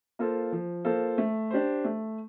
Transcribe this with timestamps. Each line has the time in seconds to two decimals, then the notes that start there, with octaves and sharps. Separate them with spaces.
0.19 A#3 F4 A4 C5
0.52 F3
0.85 A#3 F4 A4 C5
1.18 A3
1.50 D4 G4 C5
1.84 A3